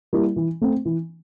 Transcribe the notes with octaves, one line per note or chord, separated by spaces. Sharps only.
G3 A#3 E4
E3
A3 C4
E3